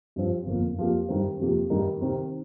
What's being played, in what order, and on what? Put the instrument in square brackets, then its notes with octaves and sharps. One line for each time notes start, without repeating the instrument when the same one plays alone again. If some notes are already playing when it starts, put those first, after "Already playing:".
[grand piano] G2 F3 C4
G1 F2 F3 A#3
F2 F3 A#3 G4
G2 D#3 G3 C4
F2 C3 F3 A#3 G4
G2 D#3 G3 D#4 A#4
C3 D#3 C4